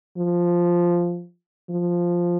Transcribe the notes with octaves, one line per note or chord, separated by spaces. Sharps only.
F3
F3